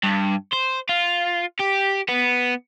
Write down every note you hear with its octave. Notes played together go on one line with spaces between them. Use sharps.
G2
C5
F4
G4
B3